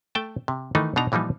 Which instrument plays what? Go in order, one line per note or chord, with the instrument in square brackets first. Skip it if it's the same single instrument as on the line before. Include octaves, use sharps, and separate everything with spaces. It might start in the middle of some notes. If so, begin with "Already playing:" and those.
[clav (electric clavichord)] A3 G5 A5
C3
D#3 E3 A3 D#4
B2 D4 D#4 A#5
A#2 E3 F3 G3 D#4